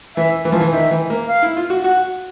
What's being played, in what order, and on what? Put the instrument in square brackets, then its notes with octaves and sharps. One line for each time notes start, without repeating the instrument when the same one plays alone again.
[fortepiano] E3 [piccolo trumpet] E5
[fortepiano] E3
F3
E3
[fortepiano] D#3 [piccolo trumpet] E5
[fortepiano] E3
A#3
[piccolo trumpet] F5
[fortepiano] E4
F4
F#4
[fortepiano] F#4 [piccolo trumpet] F#5